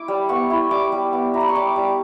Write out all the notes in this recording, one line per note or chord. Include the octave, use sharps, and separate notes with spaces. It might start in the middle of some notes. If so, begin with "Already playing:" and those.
Already playing: E4 D6
G3
B3 C#6
E4
G3 D6
G3
B3
E4 A#5
B5
C#6
G3 D6
G3